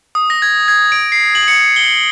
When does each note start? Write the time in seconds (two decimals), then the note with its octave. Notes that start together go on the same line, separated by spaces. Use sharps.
0.15 D#6
0.30 A#6
0.42 G#6
0.68 G#6
0.92 D7
1.12 C7
1.35 F#7
1.48 C#7
1.76 G7